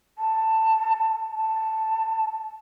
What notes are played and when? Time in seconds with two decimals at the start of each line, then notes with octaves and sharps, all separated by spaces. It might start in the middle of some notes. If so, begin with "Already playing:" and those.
0.18 A5
1.36 A5